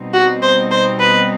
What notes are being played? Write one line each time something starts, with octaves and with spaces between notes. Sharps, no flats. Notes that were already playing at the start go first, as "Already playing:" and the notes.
Already playing: B2 G3 C4 D#4
F#4
C5
C5
B4